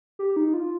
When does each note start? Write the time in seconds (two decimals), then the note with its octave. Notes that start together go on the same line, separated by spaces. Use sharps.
0.19 G4
0.36 D#4
0.54 F4